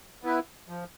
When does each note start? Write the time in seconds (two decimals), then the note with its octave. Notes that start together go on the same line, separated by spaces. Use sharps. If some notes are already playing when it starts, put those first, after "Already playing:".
0.23 B3 E4 B4
0.69 F3